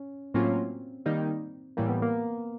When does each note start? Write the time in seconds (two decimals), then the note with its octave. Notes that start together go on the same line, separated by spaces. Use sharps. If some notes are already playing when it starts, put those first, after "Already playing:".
Already playing: C#4
0.34 A2 F#3 A#3 C4 C#4 F4
1.06 D#3 G3 A#3 D#4
1.77 A2 E3 G3 A#3
1.89 B3
2.02 A#3